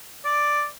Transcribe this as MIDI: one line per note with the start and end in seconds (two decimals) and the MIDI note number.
0.25 0.65 74